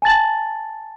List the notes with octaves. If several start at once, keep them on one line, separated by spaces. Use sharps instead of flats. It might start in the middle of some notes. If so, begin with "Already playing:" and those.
G#5 A5 A6 F#7